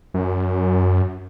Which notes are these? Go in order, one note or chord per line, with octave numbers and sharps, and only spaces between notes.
F#2